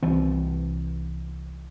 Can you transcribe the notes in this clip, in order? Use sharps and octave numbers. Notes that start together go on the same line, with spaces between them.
C2 E3 C4